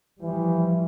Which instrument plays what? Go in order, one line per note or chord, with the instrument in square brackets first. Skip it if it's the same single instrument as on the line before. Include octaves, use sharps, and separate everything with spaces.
[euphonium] E3 [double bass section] F3 G3